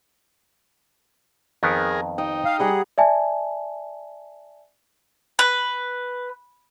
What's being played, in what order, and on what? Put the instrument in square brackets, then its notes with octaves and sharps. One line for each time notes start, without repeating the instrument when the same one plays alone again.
[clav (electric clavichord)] F2 D#3 B3 [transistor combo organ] G#4 A#4
[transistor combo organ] D#4 [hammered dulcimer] G5
[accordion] F5
[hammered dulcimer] G3 F#5 A#5 [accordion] G#4
[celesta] D5 E5 G#5 A5
[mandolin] B4